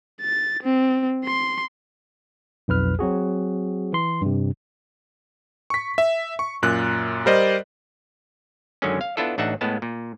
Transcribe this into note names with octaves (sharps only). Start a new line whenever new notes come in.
A6
C4
C6
B1 F2 B4 F6
F#3 C4 F#4 G#4
E3 C6
G2 C3
C#6 B6
E5
C#6
F#2 A#2 F#6
G3 A#4 C5 D5 D#5
F#2 D3 D#3 G#3 C#4
F5
B3 D4 E4 F4 A4
A1 D4 D#4 E5 F#5
A2 G#3 B3 A5
A#2